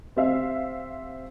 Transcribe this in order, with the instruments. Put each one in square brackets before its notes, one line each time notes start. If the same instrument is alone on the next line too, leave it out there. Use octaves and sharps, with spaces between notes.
[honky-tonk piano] C4 G4 E5 F5